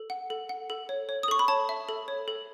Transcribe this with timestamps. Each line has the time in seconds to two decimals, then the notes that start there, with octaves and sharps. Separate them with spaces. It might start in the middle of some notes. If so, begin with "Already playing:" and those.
Already playing: A4
0.10 F#5
0.30 A4
0.49 F#5
0.70 A4
0.89 C#5
1.09 C#5
1.23 D#6
1.28 A4 C#6
1.39 B5
1.48 C#5 A5
1.69 E5
1.89 A4
2.08 C#5
2.28 A4